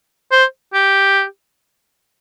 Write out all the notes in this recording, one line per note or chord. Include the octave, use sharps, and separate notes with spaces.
C5
G4